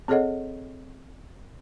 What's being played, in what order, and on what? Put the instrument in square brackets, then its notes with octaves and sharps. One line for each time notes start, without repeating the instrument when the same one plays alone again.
[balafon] C4 G#4 A4 C#5 D#5 F#5